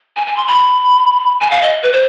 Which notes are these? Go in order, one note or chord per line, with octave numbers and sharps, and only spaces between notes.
G#5
G#5
C6
B5
G#5
F5
D#5
B4
C5